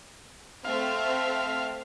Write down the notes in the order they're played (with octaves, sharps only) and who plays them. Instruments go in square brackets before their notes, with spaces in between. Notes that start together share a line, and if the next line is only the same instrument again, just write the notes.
[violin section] A3 C4 E5 [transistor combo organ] F5